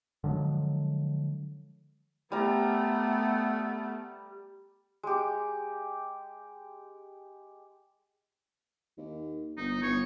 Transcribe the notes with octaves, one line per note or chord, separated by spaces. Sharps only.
D3 F3 F#3 G#3
G3 A3 B3 A#5
G#3 G4
D#2
G1 D#4
G1 C#5